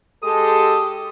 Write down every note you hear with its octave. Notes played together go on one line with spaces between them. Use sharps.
G#3 G4 A4 D#6